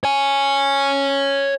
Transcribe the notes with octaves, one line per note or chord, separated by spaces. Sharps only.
C#5 G#5